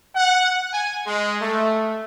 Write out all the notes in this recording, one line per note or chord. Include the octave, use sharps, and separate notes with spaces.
F#5
G#5
G#3
A3